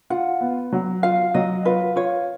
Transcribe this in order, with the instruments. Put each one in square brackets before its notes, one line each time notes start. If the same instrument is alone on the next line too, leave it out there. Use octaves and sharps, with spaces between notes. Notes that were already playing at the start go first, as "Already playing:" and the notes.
[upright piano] F4 [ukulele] F#5
[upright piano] B3
F#3
[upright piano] F4 [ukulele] F5
[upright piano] F#3 [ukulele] D#5
[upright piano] F4 [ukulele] B4
[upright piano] F4 [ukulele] C#5